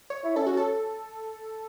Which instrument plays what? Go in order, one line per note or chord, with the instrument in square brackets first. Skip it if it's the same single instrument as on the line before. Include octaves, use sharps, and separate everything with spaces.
[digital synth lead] C#5
[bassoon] E4
[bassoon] C#4 [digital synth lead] A4
[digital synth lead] F#4
A4